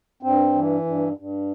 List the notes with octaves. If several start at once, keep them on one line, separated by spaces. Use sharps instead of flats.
G2 C4
E3
G2
G2